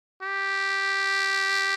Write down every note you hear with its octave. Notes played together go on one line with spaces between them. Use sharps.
G4